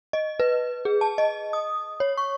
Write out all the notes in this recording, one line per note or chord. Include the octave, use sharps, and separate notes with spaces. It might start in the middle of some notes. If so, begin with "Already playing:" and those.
D#5
B4
G#4
A5
D#5
D#6
C#5
C#6